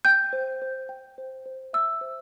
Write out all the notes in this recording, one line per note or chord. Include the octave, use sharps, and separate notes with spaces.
G5 G6
C5
C5
G5
C5
C5
E5 E6
C5